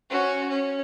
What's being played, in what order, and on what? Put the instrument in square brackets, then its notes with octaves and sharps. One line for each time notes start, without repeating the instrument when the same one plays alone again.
[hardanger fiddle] C#4 F#4
C#4